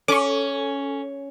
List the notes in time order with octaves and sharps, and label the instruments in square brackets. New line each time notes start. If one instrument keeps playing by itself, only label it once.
[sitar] C#4 [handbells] A4 [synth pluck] C#6 D6